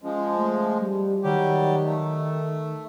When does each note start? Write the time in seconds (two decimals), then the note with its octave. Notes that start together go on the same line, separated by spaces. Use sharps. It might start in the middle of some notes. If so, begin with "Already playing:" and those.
0.02 F3 G#3 C#4
0.35 A3
0.79 G3
1.23 D#3 F#3 G3 G4
1.84 A3